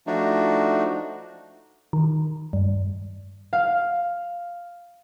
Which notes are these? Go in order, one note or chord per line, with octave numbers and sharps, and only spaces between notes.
F3 A3 D4 D#4 F#4
D#3
G2
F5